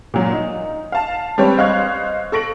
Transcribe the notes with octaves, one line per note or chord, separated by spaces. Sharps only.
A#2 F#3
D#4
F5 A5
G3 C4 G4 B4 C#5
C5 D#5 F5 C#6 F#6 G#6
A4 C#6 A#6 D7 F#7